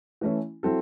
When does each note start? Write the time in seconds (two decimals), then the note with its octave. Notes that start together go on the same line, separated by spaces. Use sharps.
0.21 E3 A3 C#4 E4
0.63 F#3 C4 E4 A4